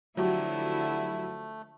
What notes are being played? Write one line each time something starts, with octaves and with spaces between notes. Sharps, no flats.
D3 F3 F#3 A3 E4 F#4 G4